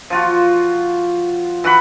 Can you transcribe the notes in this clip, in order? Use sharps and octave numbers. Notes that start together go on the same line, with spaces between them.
F3 F4 F#4
E3 F#4 F#5 B5